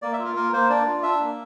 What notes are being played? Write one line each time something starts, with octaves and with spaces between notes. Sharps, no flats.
A#3 D5
E5
F4
A#4
A#3 A#4
A#3 C5
D4 D5
F4
D4 E5
A#3